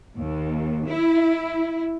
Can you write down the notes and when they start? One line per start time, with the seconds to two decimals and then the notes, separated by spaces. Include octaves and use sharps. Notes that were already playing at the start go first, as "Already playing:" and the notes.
0.17 D#2
0.88 E4